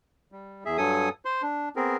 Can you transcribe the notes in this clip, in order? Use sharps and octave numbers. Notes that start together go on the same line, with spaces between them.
G3
E2 G#4 E5
G2 F#3 A4 G#5 D#6
C5 C6
D4
B3 C4 G#4 A#4